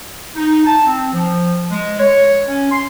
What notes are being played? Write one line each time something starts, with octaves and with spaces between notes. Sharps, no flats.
D#4
A5
C4
F3
G#3
C#5
C#4
C6